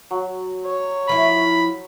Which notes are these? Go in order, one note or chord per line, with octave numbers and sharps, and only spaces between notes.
F#3
C#5
F3 E4 B5